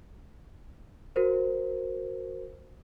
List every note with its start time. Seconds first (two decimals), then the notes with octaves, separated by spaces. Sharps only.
1.16 F#4 A#4 C5